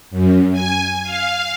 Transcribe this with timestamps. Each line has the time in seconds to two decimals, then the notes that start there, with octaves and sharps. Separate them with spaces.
0.10 F#2
0.52 G#5
1.03 F5